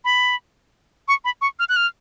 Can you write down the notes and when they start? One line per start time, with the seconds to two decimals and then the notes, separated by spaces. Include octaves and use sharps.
0.05 B5
1.08 C#6
1.25 B5
1.41 C#6
1.59 F6
1.69 F#6
1.76 F6